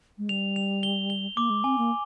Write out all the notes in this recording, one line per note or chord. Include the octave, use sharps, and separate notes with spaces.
G#3
G3 F7
F7
G7
G7
A#3 D6
G#3
C4 G#5
A#3